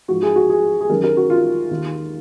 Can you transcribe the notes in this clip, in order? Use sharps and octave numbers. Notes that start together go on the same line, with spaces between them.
G#2 F3 F#4
G#4
F#4
G#4
G#4
F#2 D#3 A#4
A#4
F#4
F4
D#2 D#3